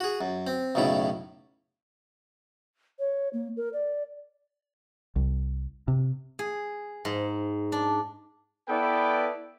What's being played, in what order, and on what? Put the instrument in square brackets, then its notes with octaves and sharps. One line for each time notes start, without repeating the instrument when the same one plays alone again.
[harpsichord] F#4 G#4
F#2
C4
B1 F#2 A2 C#3 E4
[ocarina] C#5
A#3
A#4
D5
[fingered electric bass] C2
C3
[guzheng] G#4
G#2
D4
[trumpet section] B3 E4 A4 B4 D5 G5